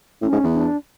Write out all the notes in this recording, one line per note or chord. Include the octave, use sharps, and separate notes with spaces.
A2 C#4
G#2
E2
D4